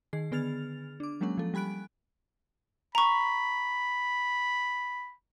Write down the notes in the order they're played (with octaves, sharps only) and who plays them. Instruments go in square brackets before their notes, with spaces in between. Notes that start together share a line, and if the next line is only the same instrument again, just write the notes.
[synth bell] D#3 G#4 C7
D3 B3 G#4 F6 A6 F7
D4 D6
F#3 G#3 A#3 C#4 F#5
F3 A4
G3 G#5 B5 F#6 D7
[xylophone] A#5 C#6 [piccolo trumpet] B5